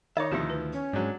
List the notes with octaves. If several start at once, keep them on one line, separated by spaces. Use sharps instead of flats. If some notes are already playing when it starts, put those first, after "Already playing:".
D#3 D#4 C#5 D5 E5 D6
D2 B2 D#3 F3 E4 F4 G4
B4
C#4
G#2 F#3 G#3 D4